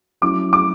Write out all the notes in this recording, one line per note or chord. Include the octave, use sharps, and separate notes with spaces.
F#3 C#4 E4 D6
D6